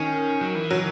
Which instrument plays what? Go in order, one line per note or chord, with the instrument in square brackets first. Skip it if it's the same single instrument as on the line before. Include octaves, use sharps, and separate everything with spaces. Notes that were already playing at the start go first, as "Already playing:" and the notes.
Already playing: [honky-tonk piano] D#3 [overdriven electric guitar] C#4
[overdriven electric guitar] F#3
E3
[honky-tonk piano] F#3